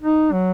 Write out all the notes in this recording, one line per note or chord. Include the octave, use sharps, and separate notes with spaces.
D#4
F#3